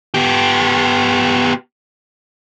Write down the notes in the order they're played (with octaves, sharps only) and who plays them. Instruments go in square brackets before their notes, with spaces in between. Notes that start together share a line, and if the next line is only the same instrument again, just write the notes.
[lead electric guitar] B3 G4